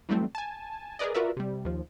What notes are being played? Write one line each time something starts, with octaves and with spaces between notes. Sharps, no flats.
E3 F#3 G3 A3 C4
G#5 A5
G#4 A#4 B4 D5 D#5
F4 F#4 A#4 B4 D5 E5
C3 G3
D#2 F3